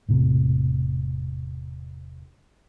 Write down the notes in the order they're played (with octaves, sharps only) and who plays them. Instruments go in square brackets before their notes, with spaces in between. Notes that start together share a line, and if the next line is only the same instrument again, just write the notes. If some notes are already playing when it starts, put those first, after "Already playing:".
[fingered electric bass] E1 A2 C3